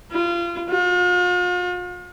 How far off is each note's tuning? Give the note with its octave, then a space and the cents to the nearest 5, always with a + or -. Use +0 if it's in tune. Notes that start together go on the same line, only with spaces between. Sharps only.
F4 -25
F4 +45